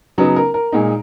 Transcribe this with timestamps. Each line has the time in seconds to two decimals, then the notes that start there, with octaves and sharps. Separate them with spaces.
0.18 C#3 F#3 B3 D#4
0.36 A#4
0.54 A#4
0.72 A#2 G#3 D#4